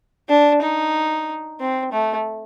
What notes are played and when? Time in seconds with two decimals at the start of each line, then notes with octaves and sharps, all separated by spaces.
0.29 D4
0.62 D#4
1.60 C4
1.92 A3